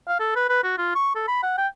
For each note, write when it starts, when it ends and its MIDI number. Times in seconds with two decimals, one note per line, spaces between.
0.08 0.18 77
0.20 0.32 69
0.35 0.45 71
0.50 0.63 71
0.64 0.74 66
0.78 0.94 65
0.95 1.12 85
1.15 1.24 69
1.28 1.38 83
1.43 1.57 78
1.58 1.68 79